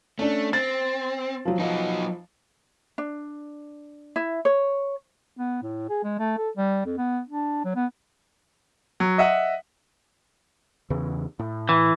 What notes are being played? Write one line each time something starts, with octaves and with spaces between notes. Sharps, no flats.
A3 C#4 D4
C4 A6
F3 F#3
F3 F#3 D#4
D4
E4
C#5
B3
A2
G#4
G#3
A3
A4
G3
F2
B3
D4
F#3
B3
F#3
D#5 E5 F#5
E2 C#3 E3
A2
E3